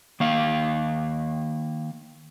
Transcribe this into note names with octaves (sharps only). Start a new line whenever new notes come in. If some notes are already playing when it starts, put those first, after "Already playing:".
D#3 A#3 F5